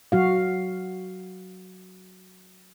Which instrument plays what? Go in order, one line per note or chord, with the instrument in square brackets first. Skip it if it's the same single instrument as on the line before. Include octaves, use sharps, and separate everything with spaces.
[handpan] F#3 F#4 F5